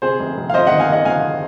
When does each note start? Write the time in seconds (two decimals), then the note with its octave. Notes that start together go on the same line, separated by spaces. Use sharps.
0.02 C3 G#4 C5
0.20 F1
0.37 F1
0.50 F5
0.54 F2 C5 D#5
0.67 D#3 D#5 F#5
0.80 F5 G#5
0.89 D#3 D#5 F#5
1.05 F2 F5 G#5